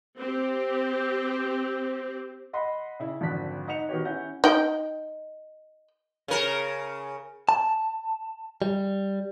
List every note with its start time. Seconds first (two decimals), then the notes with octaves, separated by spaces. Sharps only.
0.17 C4 G4
2.53 D#5 F#5 B5 C6
3.00 C#3 E4
3.21 G#1 F2 D3 D5 F#6 B6
3.68 D#4 F#5 C#7 F7
3.89 D#3 B3 F#4 G4 C#5
4.05 C#4 E4 F#5 G6
4.44 D#4 G5
6.28 C#3 A#4
7.49 A5
8.62 G3